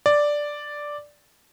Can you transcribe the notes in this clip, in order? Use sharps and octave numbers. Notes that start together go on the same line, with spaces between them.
D5